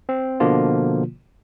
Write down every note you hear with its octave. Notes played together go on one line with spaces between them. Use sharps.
C4
B2 D3 F3 A#3 F4